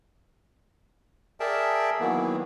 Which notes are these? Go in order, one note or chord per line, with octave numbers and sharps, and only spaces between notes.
G#4 A#4 D5 E5 G5 A5
D#3 E3 F#3 A#3 B3